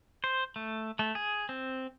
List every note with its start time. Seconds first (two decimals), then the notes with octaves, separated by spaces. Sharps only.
0.24 C5
0.56 A3
0.99 A3
1.15 G#4
1.49 C4